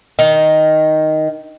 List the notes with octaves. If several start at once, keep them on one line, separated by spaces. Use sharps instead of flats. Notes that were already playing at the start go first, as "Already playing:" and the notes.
D#3